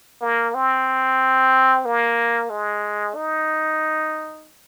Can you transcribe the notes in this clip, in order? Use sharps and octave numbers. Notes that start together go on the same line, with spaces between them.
A#3
C4
A#3
G#3
D#4